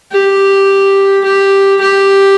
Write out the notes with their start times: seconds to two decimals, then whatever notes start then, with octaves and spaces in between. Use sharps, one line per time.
0.12 G4
1.25 G4
1.81 G4